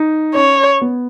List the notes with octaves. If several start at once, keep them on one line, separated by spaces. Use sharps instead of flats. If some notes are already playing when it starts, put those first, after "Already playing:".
Already playing: D#4
C#4 C#5
B3